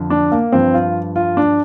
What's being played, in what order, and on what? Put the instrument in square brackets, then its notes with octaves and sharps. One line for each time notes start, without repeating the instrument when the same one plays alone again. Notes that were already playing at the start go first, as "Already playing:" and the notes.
Already playing: [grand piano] F2 D3 F3
D4
A#3
G2 F3 C4
F4
F4
D4